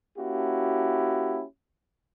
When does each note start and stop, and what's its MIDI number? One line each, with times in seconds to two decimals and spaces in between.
0.18 1.43 58
0.18 1.43 61
0.18 1.43 64
0.18 1.43 66
0.18 1.43 67